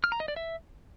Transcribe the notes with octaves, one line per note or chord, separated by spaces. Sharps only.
F6
A#5
D#5
D5
E5